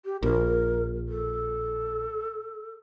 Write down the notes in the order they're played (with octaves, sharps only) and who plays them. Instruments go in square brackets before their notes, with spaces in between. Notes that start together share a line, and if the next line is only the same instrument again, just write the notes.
[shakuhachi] G4
[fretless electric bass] A#1 [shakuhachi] A#4
[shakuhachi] A4